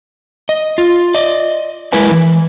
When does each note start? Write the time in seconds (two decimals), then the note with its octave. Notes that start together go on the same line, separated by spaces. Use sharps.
0.49 D#5
0.78 F4
1.15 D5 D#5
1.92 G#3 E4 A#4 B4 G#5
2.11 E3